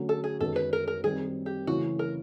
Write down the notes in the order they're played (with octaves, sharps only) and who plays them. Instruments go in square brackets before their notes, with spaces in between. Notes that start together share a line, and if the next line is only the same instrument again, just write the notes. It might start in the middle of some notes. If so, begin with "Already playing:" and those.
Already playing: [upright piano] D3 F#3 A3 C#4
[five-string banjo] A4
G#4
[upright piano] F#2 D#3 G#3 B3 [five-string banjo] A4
[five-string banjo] B4
A#4
A#4
[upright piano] D#3 G3 C4 [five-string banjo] G#4
[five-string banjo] G4
[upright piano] C#3 E3 A3 C#4 E4 [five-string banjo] F#4
[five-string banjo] A#4